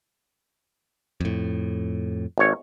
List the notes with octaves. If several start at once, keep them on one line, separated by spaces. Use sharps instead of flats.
F2 A2
G#1 C#5